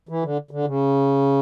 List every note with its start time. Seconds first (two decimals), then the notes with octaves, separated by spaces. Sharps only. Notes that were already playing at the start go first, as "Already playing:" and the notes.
0.09 E3
0.23 D3
0.51 D3
0.65 C#3